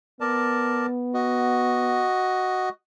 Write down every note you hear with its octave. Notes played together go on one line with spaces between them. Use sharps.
B3 A#4 D5 A5
F#4 D#5